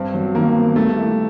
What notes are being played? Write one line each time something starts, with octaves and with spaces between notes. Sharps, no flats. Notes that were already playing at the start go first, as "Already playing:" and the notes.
Already playing: G2 C4
F#3
D#3 A#3
B3
G3 A3
E4